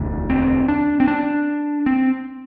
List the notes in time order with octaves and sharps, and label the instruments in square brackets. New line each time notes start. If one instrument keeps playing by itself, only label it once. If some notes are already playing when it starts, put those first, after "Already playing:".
Already playing: [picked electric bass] E1 D2 D3
C4
D4
C4
D4
C4